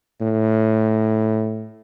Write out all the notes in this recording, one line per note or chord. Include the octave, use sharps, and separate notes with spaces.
A2